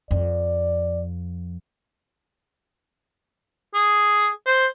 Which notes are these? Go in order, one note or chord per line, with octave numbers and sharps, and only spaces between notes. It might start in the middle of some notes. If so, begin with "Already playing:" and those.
F2 D5
G#4
C5